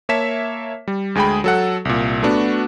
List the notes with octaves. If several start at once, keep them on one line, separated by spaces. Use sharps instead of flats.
A#3 C#5 E5 A5 B6 E7
G3
D2 G#3 G#4 G5 B5
F#3 A4 F#5
C2 A#2
A3 B3 D4 F#4